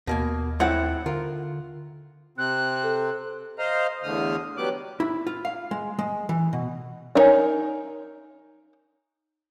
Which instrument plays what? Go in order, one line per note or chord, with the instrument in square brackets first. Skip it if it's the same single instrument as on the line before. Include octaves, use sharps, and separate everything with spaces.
[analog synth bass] D#2 [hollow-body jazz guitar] B2 A#3 G#5
[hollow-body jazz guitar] A2 C4 E4 [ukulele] F#5
[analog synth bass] D3 [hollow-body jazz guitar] F4 A#4
[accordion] C3 C4 [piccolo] F#6
[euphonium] A4
[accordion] C5 D#5 F5 A#5
E2 A2 D3 D#6 F6
F#3 G3 B3 D6 F#6
[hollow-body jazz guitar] E4
F4
F5
G#3
G#3
E3
B2
[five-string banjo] D4 D#4 A#4 C#5 G#5